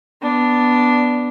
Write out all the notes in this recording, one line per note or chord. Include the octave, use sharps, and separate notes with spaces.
B3 D4